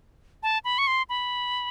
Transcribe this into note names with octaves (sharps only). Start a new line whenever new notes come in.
A5
B5
C#6
C6
B5